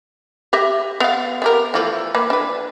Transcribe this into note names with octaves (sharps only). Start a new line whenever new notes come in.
G4 D#5 E5
B3 F5
B3 G4 A#4
E3 F3 A3
A#3 B4
D4 B4